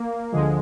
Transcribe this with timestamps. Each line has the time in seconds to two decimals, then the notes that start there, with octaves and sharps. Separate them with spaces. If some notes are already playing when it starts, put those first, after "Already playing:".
Already playing: A#3
0.32 D2 D3 F3 G#3